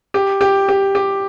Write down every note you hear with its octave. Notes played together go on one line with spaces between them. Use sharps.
G4
G4
G4
G4